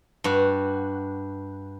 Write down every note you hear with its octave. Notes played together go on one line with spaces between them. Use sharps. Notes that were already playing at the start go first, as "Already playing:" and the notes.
G2 F#4